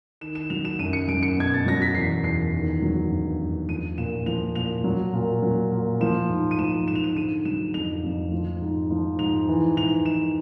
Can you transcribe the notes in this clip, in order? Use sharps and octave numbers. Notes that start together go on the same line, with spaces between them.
D#3 E7
E7
F#3 F7
E7
F#2 D#7
C#7
F#2 D7
C#7
B2 G#6
A6
F#3 A#6
B6
E2 C7
E2 C7
D#3
F#3
G2
G2
F3 D#7
A#2 E7
F3 F7
A#2 F7
F#3
A#2
F#3
A#2
F3 E7
G#2
D#7
F3 E7
G#2 E7
F7
E7
D3 D#7
F#3 E7
F2 F7
F2
F3
G#2
F3
G#2 F7
E3
G#2 F7
E3 E7